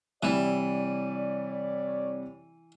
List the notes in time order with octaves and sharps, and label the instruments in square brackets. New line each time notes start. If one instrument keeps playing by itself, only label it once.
[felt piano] C3 G3 E4 [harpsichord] E3 [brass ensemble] C#5 D5